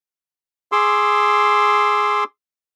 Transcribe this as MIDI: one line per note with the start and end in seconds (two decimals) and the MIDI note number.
0.72 2.24 68
0.72 2.24 84
0.72 2.24 86
0.72 2.24 88